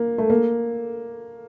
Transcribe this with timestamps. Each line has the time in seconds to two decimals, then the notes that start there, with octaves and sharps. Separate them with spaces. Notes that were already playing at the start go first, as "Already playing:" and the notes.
Already playing: A#3
0.18 A3
0.30 A#3